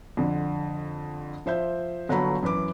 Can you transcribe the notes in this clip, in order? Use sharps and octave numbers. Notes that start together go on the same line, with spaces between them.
F2 D3
F3 C5 E5 G6
G1 F#3 A4 A#5 B5
F#2 E3 B4 D6